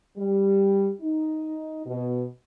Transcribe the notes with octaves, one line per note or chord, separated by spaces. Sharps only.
G3
D#4
B2